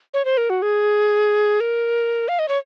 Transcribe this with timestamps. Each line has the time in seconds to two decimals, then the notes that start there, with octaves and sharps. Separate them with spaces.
0.14 C#5
0.25 C5
0.37 A#4
0.50 F#4
0.62 G#4
1.60 A#4
2.28 F5
2.39 D#5
2.48 C#5